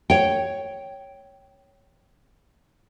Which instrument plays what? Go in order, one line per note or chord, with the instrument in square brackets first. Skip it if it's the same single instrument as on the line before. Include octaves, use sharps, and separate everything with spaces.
[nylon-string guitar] C#5 G5